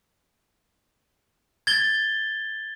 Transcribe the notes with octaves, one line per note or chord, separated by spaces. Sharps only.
G#6 A6 G7